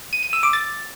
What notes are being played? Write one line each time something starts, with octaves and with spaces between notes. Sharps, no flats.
D#7
D#7
E6
D6
A6